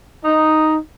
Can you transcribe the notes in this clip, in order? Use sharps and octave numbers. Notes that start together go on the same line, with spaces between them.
D#4